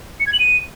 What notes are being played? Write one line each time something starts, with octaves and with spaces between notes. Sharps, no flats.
C#7
G#6
F#7
D#7